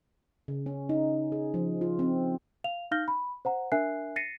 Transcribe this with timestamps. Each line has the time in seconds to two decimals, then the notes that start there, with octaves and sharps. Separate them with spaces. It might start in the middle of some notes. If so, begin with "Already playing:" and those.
0.48 C#3
0.66 C#4
0.89 D#4
1.32 G#4
1.54 F3
1.81 F4
1.99 C4
2.64 F5 F7
2.91 D#4 F5 F6 G6 A#6 G7
3.08 B5
3.45 C5 F#5 A#5
3.72 D4 A#4 E5 G#5 F#6 C7
4.16 A6 A#6 C7 C#7 D#7